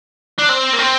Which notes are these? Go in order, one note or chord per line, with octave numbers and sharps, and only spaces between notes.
D4
C4
A#3
C4